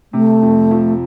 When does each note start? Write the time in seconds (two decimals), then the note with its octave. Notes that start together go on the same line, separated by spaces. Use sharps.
0.13 C3 A3
0.42 F2
0.71 F3